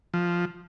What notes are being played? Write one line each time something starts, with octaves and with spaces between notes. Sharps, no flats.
F3